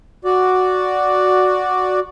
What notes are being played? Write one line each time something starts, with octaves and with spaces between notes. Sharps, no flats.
F#4 D5